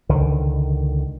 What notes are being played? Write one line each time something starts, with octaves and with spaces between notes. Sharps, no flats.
C#2 D3 D#3